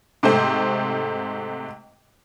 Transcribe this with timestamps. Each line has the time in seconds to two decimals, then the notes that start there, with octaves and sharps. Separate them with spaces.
0.23 G#2 C3 A3 C5